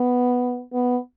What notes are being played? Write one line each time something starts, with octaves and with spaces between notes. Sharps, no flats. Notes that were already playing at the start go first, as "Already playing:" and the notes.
Already playing: B3
B3